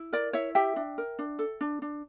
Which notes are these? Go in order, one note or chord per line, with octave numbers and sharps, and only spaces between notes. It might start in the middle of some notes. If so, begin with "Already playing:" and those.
Already playing: E4
A#4 D5
E4 C#5 E5
G4 E5 G5
D4
A#4
D4
A4
D4
D4